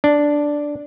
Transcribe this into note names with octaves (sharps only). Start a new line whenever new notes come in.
D4